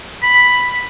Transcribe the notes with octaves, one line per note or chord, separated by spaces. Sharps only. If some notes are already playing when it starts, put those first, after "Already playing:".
B5